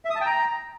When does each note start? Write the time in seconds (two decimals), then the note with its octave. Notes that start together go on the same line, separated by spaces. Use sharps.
0.05 E5
0.10 D#6
0.15 A5
0.21 G5
0.26 A#5